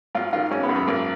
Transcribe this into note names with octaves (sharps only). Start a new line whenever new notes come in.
G#1 F4
D#3 F4
G#1 C#4
B3
F#2
B3
G#1 A#3